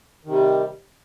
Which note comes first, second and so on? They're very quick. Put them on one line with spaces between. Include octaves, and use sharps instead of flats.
D#3 C3 G3